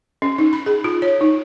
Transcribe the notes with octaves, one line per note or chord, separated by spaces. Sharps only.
C#4
D#4
B5
G#4
F4
C#5
D#4